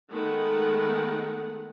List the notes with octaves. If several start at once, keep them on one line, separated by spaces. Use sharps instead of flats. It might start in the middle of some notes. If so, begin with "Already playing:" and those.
D#3 G#3 A3 B3 F#5